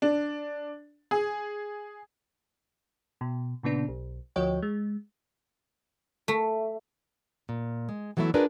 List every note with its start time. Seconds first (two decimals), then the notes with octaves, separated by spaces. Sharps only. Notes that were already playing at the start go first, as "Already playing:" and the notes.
0.02 D4
1.11 G#4
3.21 B2
3.63 A#2 C#3 B3 D4
3.88 B1
4.36 D2 F3 F#4 C#5 D#5 G5
4.62 G#3
6.28 A3
7.49 A#2
7.89 G#3
8.17 E3 F#3 A3 B3 E4
8.34 D4 F4 G#4 A#4 B4 D5